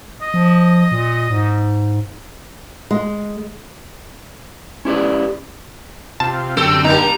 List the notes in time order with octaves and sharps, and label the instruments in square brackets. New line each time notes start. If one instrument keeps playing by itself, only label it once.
[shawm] D#5
[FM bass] F3
A#2
G#2
[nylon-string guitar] G#3
[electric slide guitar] C#4 E4 G4 B4 D5
[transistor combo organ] C3 F4 [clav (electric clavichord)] A5
[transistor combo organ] F#2 D3 G4 [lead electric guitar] C4 G5 [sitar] A4
[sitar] G3 A#3 D4 [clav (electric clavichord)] D#4 [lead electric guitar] A#5